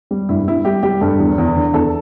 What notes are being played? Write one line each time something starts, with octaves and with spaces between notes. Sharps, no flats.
G3
G2 E4
G3 E4
G3 G4
G3 G4
G2 A4
E2
E2
D3
E2 A4